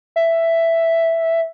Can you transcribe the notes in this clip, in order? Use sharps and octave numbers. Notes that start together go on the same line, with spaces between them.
E5